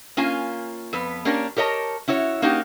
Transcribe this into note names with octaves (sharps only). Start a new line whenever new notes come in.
A#3 C#4 F4 G#5
F2 B3 B4
A#3 C#4 D4 G4 A#4
G4 A#4 C#5 D#5 A5
C#4 E4 F#4 C#5
A#3 C#4 D#4 F#4 G4